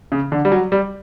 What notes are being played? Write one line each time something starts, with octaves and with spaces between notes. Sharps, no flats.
C#3
D3
G3
F#3
G3